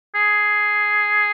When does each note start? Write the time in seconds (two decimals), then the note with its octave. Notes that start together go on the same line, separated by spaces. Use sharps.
0.15 G#4